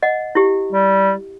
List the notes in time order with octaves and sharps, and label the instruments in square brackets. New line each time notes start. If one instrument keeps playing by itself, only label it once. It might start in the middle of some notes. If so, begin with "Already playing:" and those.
[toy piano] D#5 F#5
E4 G4
[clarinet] G3